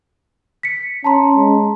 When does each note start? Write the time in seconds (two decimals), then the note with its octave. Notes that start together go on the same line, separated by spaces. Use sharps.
0.63 B6 C#7
1.04 C#4 A5 A#5 C6
1.36 G#3